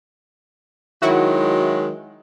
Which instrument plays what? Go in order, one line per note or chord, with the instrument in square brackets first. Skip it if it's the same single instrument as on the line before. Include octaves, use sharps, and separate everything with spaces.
[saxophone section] D#3 F#3 G#3 [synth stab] E4 F#4